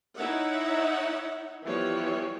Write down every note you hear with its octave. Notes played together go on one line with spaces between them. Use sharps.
D#4 E4 C#5 E5 F#5
E3 F3 G3 B3 C#5